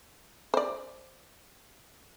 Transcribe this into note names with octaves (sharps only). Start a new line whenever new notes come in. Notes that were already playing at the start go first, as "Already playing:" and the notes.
C5 D5